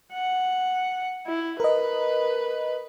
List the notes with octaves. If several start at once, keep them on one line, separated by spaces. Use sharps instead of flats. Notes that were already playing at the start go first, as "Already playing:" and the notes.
F#5
E4
A#4 B4 D#5